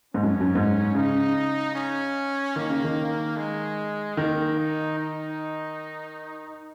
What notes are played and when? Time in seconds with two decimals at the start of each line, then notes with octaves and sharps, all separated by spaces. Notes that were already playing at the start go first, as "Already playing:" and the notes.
0.14 G#2 C#4
0.23 F#2
0.40 F#2
0.55 G#2
0.95 C#3 D#4
1.75 C#4
2.56 D#3 A#3
2.70 C#3
2.84 D#3
3.37 G#3
4.17 D#3 A#3
4.58 D#4
4.98 D#4